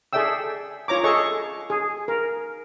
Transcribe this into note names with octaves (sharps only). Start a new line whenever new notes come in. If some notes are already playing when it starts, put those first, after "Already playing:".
G#4 A4 D5 E5 G5 E6
F4 C#5 A#5 D6
G#4 A4 D#5 C#6
G#4
A#4